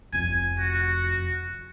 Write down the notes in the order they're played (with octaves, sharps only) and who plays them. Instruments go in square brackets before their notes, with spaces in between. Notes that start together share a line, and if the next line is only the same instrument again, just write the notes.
[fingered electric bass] F1 F2 [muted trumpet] G#5
[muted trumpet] F#4